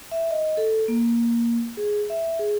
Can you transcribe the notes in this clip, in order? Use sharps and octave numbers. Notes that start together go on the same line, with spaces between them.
E5
D#5
A4
A#3
G#4
E5
G#4